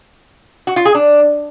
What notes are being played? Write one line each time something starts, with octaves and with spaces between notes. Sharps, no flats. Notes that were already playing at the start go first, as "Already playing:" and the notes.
F#4
F4
G#4
D4